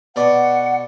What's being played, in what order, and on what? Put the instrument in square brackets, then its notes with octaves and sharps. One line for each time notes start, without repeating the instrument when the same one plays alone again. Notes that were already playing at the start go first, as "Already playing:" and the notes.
[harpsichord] B2 D5 [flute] F#5